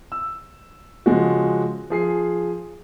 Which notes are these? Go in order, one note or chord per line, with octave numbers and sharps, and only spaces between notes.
E6
C#3 F3 G#3 F#4
F3 G#4 C7